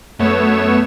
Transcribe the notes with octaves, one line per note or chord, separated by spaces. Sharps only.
F#2 A3 B3 C#5 E7